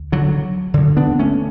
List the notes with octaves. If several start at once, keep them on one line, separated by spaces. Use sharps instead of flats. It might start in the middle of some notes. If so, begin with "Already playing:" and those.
Already playing: D2
D3 F#3
D2 D3
B3 D4
A3 C#4